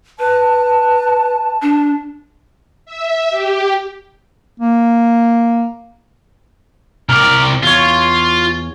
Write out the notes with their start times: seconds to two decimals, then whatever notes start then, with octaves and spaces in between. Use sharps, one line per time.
0.19 B4 A5
1.62 D4
2.86 E5
3.30 G4
4.60 A#3
7.09 C2 A#4 D5
7.63 E2 F4 C#5